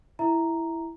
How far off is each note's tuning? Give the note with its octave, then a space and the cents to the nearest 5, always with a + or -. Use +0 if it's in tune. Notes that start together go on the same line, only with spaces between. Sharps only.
E4 +5 E5 -10 A#5 +0